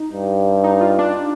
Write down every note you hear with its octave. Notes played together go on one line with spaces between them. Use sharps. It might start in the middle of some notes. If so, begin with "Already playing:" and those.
Already playing: D#4
G2
D#4
F4
D4